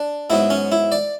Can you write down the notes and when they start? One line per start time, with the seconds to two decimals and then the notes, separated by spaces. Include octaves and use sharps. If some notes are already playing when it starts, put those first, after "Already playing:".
Already playing: D4
0.30 G#2 F#3 B3 E4
0.50 C#4
0.72 E4
0.92 D5